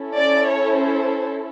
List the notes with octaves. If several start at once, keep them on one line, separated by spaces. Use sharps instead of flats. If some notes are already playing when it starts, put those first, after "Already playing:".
Already playing: C#4 E4 A4
D5
C#5
C5